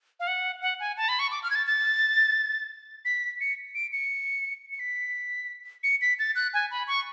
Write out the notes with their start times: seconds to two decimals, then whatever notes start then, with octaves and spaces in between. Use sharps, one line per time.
0.20 F5
0.27 F#5
0.62 F#5
0.80 G#5
0.97 A5
1.09 B5
1.19 C#6
1.31 D6
1.43 F6
1.50 G#6
1.55 A6
1.67 A6
3.05 B6
3.41 C#7
3.75 D7
3.93 C#7
4.72 C#7
4.80 B6
5.83 C#7
6.01 B6
6.19 A6
6.35 F#6
6.54 G#5
6.71 B5
6.87 C#6